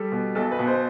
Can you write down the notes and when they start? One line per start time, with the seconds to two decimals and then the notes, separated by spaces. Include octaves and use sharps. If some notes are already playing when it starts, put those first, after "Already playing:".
Already playing: G3 A4
0.12 B2
0.35 B1 A4
0.51 B4
0.59 B2
0.67 C5